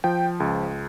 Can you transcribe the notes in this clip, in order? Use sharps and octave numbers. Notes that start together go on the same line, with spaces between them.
F3 G5
C#2